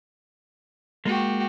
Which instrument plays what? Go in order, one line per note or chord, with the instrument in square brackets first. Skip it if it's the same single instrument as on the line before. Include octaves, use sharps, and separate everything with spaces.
[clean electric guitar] G#3 A#3 [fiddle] F#4 G4